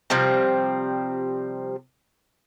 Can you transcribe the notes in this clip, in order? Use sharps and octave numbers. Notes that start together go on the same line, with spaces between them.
C3 F3 G3 C4